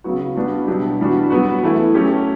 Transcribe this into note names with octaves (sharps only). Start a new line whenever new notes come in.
C#3 F#3 B3 F#4
G3 B3 D4 F#4
B2 F#3 B3 D4 G4
E3 G3 D4 F#4
F#3 B3 F#4
E3 A3 E4
F#3 A3 C#4 G4